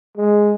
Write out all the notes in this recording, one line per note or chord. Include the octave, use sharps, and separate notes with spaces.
G#3